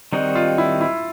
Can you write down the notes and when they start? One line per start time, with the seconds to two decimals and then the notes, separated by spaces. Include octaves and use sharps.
0.13 D#3 G3 C4 D#4 F#4
0.35 F4
0.58 E4
0.81 E4